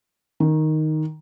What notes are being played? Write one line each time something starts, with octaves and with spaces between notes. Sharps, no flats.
D#3